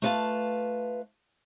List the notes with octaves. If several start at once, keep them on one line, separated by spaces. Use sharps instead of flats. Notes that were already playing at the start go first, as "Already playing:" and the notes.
A3 F4 B4 D5 F5 A5